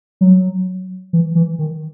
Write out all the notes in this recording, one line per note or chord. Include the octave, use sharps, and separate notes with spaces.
F#3
E3
E3
D#3